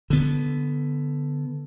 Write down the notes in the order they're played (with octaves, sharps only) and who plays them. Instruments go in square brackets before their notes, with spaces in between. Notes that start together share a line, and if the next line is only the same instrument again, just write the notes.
[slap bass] D3 B3